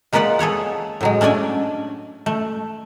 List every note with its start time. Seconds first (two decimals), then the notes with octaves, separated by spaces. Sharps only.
0.13 G#3 A#3 F4 B4 D5 F#5
0.39 G#4 A4 C#5 F#5
1.01 A2 F#3 G#3
1.21 A3 C#4 D4 D5 G#5
2.26 A3